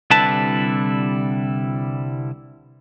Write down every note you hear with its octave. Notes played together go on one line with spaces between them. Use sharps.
C2 D3 G3 E4 B4 A5